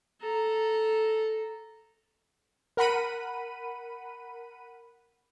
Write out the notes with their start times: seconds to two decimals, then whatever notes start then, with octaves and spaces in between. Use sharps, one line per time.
0.21 A4 A#5
2.77 A#4 F#5 B5 D#7